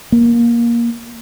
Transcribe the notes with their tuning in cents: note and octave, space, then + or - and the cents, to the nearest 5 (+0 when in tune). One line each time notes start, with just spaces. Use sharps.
A#3 +15